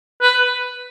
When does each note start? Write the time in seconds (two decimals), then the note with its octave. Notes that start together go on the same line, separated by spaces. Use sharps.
0.22 B4